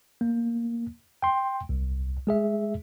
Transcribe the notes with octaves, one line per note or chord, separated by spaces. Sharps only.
A#3
G5 C6
C2
G#3 G#4 E5